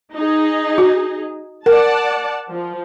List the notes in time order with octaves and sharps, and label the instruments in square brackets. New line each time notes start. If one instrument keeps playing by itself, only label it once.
[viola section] D#4 G#4
[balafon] F#4
[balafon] A#4 [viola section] D5 F#5 A5
[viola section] F3